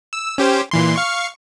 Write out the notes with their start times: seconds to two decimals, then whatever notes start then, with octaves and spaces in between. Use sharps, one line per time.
0.13 E6
0.38 C#4 G4 C5
0.71 A#2 E3 C6
0.96 F5 C#6